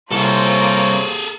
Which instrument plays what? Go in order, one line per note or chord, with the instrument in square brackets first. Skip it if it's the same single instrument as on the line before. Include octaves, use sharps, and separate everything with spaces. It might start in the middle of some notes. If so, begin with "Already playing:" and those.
[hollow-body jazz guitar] C2 [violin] A#3 F4 [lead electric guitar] G#4 A4 [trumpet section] C5 C#5